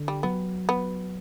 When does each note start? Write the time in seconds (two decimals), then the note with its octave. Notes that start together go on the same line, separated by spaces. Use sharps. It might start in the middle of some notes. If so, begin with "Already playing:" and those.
Already playing: D3
0.08 G3
0.23 F#3 B3
0.69 B3